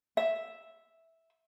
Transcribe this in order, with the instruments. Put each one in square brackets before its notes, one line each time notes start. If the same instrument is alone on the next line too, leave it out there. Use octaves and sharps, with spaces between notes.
[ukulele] E5